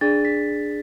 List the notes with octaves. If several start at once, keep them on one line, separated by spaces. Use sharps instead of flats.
D4 G#4 D5 A6
B6